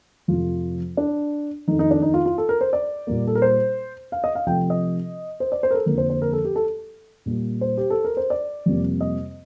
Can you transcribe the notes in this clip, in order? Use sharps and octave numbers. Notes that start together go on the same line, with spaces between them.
F2 C3 F3 A3 F4
D4
F2 D#3 A3 D#4
D#4
D4
D#4
F4
F4
A4
A#4
C5
D5
A#2 G3 A#3
A4
A#4
C5
F5
D#5
F5
C3 F3 A3 G5
D#5
C5
D5
C5
A#4
A4
F2 D3 F3 A#3 A#4
C5
C5
A#4
A4
G4
A4
A#2 G3 A#3
C5
G4
A4
A#4
C5
D5
F2 C3 G3 A#3
D#5